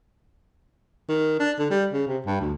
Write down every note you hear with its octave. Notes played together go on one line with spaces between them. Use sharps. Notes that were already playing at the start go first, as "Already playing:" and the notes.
D#3
D4
D3
G3
C#3
C3
G2
D2